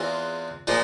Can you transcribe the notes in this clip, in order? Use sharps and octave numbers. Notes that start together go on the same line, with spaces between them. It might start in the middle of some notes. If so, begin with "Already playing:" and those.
Already playing: E2 E3 G#3 C4 F4
A#2 F3 G#3